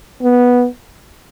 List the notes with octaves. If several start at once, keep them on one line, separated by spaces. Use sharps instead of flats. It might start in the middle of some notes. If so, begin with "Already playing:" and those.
B3